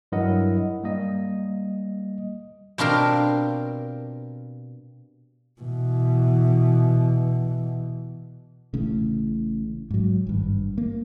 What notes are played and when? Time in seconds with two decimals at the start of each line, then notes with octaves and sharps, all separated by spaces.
0.12 G2 F#3 E4 A#4 D#5 F#5
0.83 G3 A#3 D#5
2.78 B2 C4 D4 F4 G4 A#4
5.61 B2 E3
8.74 A1 A2 C#3
9.90 G#2 F#3
10.27 G#1 G2
10.78 A#3